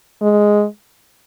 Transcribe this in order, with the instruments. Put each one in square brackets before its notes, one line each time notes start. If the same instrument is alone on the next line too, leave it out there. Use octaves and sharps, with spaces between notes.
[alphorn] G#3